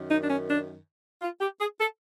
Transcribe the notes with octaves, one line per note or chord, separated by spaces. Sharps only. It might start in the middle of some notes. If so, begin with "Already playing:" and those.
Already playing: F#2 D#3
D#4
D4
C#4
D4
F4
G4
G#4
A4